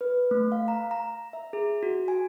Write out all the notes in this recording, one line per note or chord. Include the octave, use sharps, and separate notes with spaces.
B4
A3
F5
A#5
A#5
E5
G#4
F#4
G#5